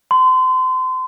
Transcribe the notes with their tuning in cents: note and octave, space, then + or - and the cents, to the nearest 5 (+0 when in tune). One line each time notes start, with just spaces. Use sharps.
C6 -30